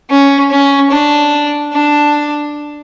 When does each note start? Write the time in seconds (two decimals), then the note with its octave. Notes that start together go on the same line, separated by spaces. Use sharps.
0.10 C#4
0.51 C#4
0.91 D4
1.73 D4